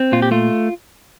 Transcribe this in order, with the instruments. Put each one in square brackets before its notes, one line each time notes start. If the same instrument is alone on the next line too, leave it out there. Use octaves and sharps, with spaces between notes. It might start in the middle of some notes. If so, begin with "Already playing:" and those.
Already playing: [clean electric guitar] C4
A#2 F4
G4
A3 F4